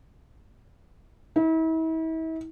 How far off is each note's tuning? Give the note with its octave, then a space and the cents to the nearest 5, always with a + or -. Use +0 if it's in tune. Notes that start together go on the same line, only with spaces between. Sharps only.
E4 -40